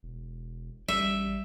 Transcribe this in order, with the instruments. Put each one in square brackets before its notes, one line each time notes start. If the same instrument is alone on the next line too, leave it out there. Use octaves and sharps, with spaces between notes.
[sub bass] E1
[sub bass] A1 [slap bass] G3 [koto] E5